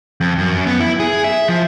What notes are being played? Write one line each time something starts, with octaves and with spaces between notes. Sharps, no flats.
F2
F#2
B3
E4
G#4
E5
F3